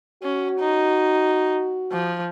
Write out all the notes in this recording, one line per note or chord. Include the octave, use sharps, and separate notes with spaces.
C#4 F#4
D#4
F3